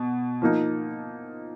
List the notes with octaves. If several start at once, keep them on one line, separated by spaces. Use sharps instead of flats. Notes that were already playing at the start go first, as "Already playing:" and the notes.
Already playing: B2
F3 A#3 D#4